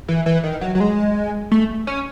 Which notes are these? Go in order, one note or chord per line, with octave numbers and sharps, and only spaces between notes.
E3
E3
D#3
F#3
F#3
G#3
A3
C#4